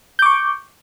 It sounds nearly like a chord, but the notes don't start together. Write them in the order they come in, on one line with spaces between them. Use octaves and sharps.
G6 D6 C#6